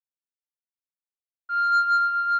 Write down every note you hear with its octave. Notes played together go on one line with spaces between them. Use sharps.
F6